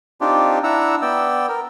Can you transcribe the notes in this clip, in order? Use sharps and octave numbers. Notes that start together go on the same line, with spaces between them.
C4 D4 D#4 F4 G4
D4 E4 F#5 A#5 E6
B3 D5 G5 E6
A#4